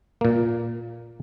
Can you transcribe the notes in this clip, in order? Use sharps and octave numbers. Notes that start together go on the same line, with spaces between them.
A#2 A#3